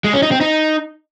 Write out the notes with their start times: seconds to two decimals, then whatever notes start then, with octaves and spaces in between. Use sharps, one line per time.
0.04 G#3
0.13 C#4
0.23 D#4
0.32 C4
0.41 D#4